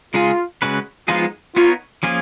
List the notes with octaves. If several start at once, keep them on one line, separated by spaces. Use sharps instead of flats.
C#3 G#3 D#4 F4 G#4
C#3 G#3 C#4 F#4 B4
F3 G#3 B3 D#4 F4 G#4
B3 D#4 F4 A#4 C#5
F3 A#3 C#4 F4 G#4